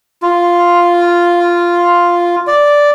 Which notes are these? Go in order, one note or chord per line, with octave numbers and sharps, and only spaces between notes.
F4
D5